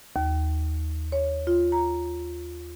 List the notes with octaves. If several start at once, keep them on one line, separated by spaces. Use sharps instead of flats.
D#2
C#5
F4
A#5